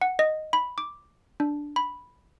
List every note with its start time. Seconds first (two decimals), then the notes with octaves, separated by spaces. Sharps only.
0.01 F#5
0.19 D#5
0.53 B5
0.78 D6
1.40 D4
1.76 B5